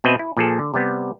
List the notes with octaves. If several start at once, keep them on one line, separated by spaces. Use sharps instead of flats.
B2 C4 B4 D#5 E5
E4
A#2 F3 G#4 A4
D3
C3 G3 B3